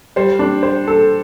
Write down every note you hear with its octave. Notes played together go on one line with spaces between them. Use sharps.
G3 C5
D4
C5
A4